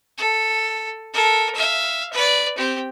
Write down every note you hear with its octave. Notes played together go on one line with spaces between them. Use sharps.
A4
A4 A#4
E5 F5
B4 D5
C4 G4